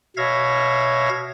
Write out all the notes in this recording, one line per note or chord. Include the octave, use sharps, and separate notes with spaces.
B2 C#5 E5 F5 G#6 A#6